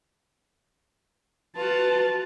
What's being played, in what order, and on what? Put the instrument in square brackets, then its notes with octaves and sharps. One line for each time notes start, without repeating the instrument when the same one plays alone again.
[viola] F4 F#4 [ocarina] B4 [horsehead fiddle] A5